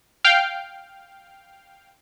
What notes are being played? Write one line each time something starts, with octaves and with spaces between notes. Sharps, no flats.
F5 G5